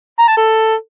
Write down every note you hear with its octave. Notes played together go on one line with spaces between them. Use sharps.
A#5
A5
A4